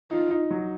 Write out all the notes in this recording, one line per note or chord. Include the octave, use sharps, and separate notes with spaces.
D#4 F4
D#4
F#3